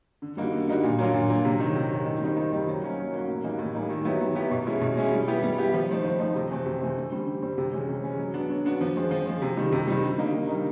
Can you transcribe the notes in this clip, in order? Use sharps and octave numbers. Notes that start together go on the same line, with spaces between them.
D3
G3 A#3 D#4 F#4
D3
G3 A#3 D#4 F#4
A#2
F#3 A#3 D4 F4
A#2
F#3 A#3 D4 F4
C3
D#3 F#3
C3
D#3 F#3
D#3
G3 C4 D#4
D#3
G3 C4 D#4
F#3
A#3 C#4 F#4
F#3
A#3 C#4 F#4
A2
E3 G3 A#3 D#4
A2
E3 G3 A#3 D#4
D#3
F#3 B3 E4 G4
D#3
F#3 B3 E4 G4
B2
G#3 C#4 E4
B2
G#3 C#4 E4
G3
B3 E4 G4
G3
B3 E4 G4
F3
A3 C4 D#4
F3
A3 C4 D#4
C3
E3 A3 C4
C3
E3 A3 C4
D3
G3 C4
D3
G3 C4
C3
E3 G#3 C#4
C3
E3 G#3 C#4
F#3
B3 D4 F#4
F#3
B3 D4 F#4
F3
G#3 C4
F3
G#3 C4
C3
D#3 G3
C3
D#3 G3
D3
G3 A#3 D#4
D3
G3 A#3 D#4